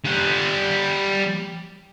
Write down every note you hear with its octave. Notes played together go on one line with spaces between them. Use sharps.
G3 F#5